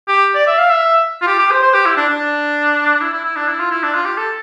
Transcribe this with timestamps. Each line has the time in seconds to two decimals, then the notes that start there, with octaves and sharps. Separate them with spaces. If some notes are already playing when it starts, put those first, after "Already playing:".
0.08 G4
0.35 D5
0.47 E5
0.58 F5
0.70 E5
1.22 F4
1.28 G4
1.39 G4
1.51 C5
1.63 C5
1.74 G4
1.86 E4
1.97 D4
2.09 D4
3.01 E4
3.13 E4
3.25 E4
3.36 D4
3.48 E4
3.60 F4
3.71 E4
3.83 D4
3.94 F4
4.05 G4
4.17 A4